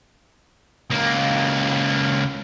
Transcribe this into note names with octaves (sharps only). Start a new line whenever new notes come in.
C#2 A#3